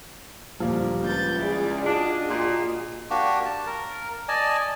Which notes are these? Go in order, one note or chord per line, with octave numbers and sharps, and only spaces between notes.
D2 A#2 F3 G3 A#3 D4
C#2 B4 G6 A6
E4 G#4 D5
D4 F4 F#4 G#4 D#5
A#2
A#3 D4 F#4 G4
A5
A#4
D5 D#5 G#5 A5